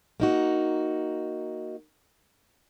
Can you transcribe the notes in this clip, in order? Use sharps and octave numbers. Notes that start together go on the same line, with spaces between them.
A#3 D#4 F#4